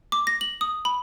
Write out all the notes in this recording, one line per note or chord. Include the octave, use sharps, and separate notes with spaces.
D6
A#6
F#7
D#6
B5